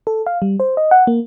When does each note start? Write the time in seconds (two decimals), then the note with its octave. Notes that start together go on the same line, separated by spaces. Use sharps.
0.07 A4
0.26 F5
0.42 G3
0.60 C5
0.77 D#5
0.91 F#5
1.07 A#3